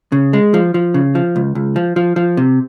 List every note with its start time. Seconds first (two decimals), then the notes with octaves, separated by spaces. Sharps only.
0.12 C#3
0.33 G#3
0.54 F3
0.74 F3
0.94 C#3
1.15 F3
1.36 C#2
1.55 C#2
1.76 F3
1.96 F3
2.16 F3
2.37 C3